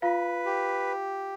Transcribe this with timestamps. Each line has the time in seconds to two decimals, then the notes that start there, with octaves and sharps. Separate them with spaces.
0.02 F4 B4 F5
0.46 G4